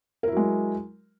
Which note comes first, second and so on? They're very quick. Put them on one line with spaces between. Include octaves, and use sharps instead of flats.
A#4 E4 F#3 G#3